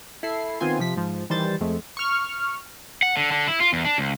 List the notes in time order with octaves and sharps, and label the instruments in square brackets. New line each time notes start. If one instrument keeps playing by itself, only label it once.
[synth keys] E4 A4 C7
D#3 B3 C4 F4 G#5 C6
C3 F3 B6
G#2 F3
D#3 E3 G3 C5 A6
F2 G#3 A3
C#6 F6
[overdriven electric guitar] F#5
D3
D3
E4
F4
E2
D4
C#2